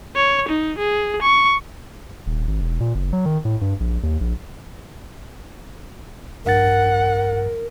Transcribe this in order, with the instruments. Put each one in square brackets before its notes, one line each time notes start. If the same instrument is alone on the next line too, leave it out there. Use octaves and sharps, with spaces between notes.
[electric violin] C#5
D#4
G#4
C#6
[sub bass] D#1
G#1
E1
A#2
F#1
F#3
D#3
A2
G2
A#1
D#2
A#1
[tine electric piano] A#1 G2 A6 [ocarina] A#4 [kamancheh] F#5